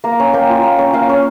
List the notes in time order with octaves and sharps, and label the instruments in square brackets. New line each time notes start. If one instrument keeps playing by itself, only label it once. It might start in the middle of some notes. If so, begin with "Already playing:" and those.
[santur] A#3 A#5
C#4 G#5
A#3 G5
F4
A#3
C#4
A#3 F5
C#4